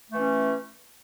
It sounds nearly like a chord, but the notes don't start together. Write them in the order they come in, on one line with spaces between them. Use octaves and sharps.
A3 E3 C#4